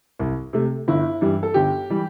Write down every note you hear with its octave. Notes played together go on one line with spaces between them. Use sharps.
C2
C3 A3
G1 E4
G2 E3 G3
A4
G1 G4
E3 G3